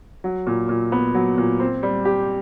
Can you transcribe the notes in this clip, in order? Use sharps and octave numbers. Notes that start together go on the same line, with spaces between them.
F#3
A#2
A#2
B3
F#3
A#2
C4
G3
G4